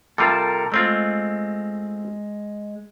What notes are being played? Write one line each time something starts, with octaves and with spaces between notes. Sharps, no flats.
C3 G3 F4 A4 A#4 A5
G#3 A3 C4 F4